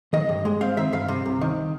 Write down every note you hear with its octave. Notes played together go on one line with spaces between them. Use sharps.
D#3 D#5
G2
G#3
C4 F5
D#3 E5
G2 F5
C3
C2
D#3